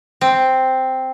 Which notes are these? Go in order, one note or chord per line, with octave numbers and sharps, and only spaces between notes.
C4